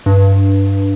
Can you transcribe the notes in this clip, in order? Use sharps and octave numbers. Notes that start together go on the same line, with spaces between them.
G2